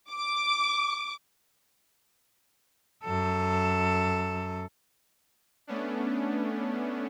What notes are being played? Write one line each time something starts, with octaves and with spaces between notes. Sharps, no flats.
D6
F#2 A4
A3 B3 C#4 D4